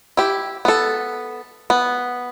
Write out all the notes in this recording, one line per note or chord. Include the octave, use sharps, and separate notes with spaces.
E4 G4
B3 A4
B3